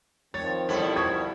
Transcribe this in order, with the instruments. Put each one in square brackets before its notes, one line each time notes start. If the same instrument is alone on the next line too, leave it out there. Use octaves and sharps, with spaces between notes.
[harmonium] D#3 F3 C4 [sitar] C#5 [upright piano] A6
[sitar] B2 G3 E4 [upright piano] A4 C#5
[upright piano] C#6 D#6 G#6